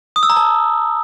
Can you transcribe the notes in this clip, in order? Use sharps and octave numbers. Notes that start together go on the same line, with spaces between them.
D#6
E6
A#5
A5